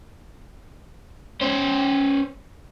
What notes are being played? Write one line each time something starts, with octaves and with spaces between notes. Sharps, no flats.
C#4 C5